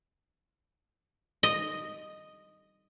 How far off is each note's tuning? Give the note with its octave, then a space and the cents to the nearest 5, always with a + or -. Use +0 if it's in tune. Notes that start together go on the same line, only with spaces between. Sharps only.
D#5 -5